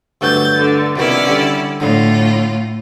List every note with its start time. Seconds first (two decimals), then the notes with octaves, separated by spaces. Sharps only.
0.21 D2 G2 F#3 G6 A6
0.58 D3
0.96 C2 B2 D#3 C#4 E4 D5
1.27 D3 G3
1.80 A2 D3 F4